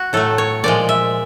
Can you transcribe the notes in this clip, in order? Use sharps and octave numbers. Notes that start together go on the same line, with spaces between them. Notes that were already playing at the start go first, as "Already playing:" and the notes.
Already playing: F#4
A2 F#3 A3 A4
C#5
A#2 F3 G#3 D5
E5